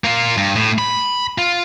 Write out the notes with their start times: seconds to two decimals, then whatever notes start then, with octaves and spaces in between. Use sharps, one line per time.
0.04 A#3 F4
0.37 G2
0.56 A2
0.78 B5
1.38 F4